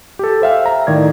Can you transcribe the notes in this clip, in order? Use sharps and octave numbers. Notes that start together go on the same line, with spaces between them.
G4 A4
C5 E5 F5 G5
A#5
A2 D#3 D5 G#6